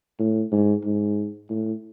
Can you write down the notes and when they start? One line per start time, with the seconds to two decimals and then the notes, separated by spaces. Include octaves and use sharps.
0.19 A2
0.52 G#2
0.84 G#2
1.50 A2